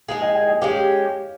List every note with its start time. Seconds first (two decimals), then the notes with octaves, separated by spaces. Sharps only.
0.08 G#3 D#4 G#4 F5 G#5
0.22 D#5 G5
0.35 D#5 G5
0.49 D#5 G5
0.62 G#3 C#4 G4 C#5 F5